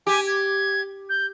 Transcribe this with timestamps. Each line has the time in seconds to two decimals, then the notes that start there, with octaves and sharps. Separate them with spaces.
0.07 G4 G#5
0.27 G#6
1.09 G6